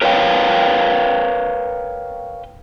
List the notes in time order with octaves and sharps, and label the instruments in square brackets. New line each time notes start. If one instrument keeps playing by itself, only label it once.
[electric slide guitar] A#4 B4 C#5 D5 F5 G5